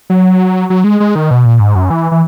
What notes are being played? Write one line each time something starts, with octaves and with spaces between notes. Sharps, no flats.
F#3
F#3
G#3
G#3
D#3
B2
A#2
G#2
F#2
E3
E3